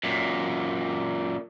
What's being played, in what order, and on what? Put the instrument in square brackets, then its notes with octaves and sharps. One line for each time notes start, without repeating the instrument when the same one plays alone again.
[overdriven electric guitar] F#2 A#2